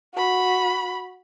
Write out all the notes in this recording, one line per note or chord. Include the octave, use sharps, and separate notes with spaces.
F#4 B5